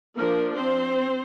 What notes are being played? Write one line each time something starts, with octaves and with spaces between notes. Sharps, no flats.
F3 A#3 D4 A#4
C4 C5